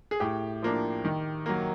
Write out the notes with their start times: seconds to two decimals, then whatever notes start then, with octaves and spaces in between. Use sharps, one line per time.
0.11 G#4
0.20 A2 G4
0.63 F3 A#3 D4
1.05 D#3
1.46 F#3 A#3